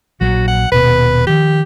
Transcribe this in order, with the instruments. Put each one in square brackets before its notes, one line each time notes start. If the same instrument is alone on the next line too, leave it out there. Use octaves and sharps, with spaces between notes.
[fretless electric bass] A#1 F#3 [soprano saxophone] F#4
[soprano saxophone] F#5
[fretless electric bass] D#1 B2 [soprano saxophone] B4
[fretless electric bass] D#3 F3 [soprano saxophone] G4